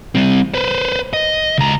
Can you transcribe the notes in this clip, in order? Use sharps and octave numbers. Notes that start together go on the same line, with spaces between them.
G3 C4
B4 C5
D#5
C#2 A#5